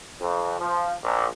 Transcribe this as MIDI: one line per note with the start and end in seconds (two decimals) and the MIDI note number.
0.20 0.54 41
0.60 0.92 53
1.03 1.26 34